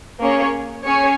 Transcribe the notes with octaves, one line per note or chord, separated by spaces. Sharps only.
A#3 C#4 G#4 C#5
C#4 G#4 C#5 G#5